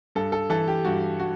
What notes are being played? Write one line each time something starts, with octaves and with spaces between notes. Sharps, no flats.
G2 A4
A4
E3 A4
G4
G2 F#4
F#4